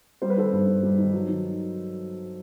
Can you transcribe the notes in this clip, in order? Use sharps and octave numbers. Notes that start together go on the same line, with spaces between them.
G3 C5
B4
D#3 A4 C5
G2
G2
G3
D#3
F#3
D#3